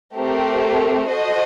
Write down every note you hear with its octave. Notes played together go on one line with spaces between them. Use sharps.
A3 C4 G4 A#4
F#4 A4 C5 D#5